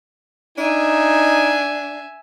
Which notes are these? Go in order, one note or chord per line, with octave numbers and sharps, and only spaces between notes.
D4 D#4 E5 G#5